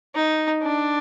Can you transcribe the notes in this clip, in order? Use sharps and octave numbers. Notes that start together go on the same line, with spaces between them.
D#4
D4